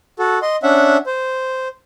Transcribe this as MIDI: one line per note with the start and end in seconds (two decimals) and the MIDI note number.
0.19 0.39 66
0.19 0.39 69
0.42 0.56 75
0.42 0.56 84
0.63 0.97 61
0.63 0.97 62
0.63 0.97 76
0.63 0.97 78
1.06 1.68 72